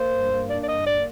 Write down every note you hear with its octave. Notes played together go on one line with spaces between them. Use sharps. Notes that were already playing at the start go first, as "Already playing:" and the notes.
Already playing: A#3 C5
G2
A#3
D4 D5
D5
G2 D#5
A#3 D5